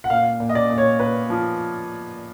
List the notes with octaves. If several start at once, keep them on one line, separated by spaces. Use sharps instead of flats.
F#5
A#2 F5
A#2
D#5
D5
A#2
C#5
A#2 B4
F3